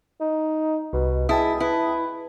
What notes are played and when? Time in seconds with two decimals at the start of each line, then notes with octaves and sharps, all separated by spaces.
0.20 D#4
0.93 C2 B2
1.29 G#3 E4 G5 A5 D#6
1.60 E4 B4